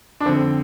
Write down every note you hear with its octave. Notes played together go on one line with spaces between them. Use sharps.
D4
F2 D3 C4